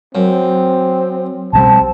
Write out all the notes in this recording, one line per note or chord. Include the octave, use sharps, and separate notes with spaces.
F#2 C4
B1 D#3 G3 C4 A5